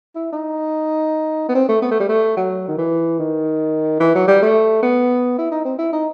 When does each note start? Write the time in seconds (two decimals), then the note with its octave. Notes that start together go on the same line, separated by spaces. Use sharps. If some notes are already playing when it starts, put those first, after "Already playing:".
0.15 E4
0.32 D#4
1.49 B3
1.55 C4
1.68 A3
1.82 B3
1.91 A3
2.00 G3
2.09 A3
2.37 F#3
2.68 D#3
2.78 E3
3.19 D#3
4.00 E3
4.15 F#3
4.27 G3
4.42 A3
4.82 B3
5.38 E4
5.51 D#4
5.65 C4
5.78 E4
5.92 D#4